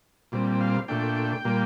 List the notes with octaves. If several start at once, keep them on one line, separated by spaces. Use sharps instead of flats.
A#2 G3 C4
F5
A#2 A3 D4 G5
A#2 G3 A#3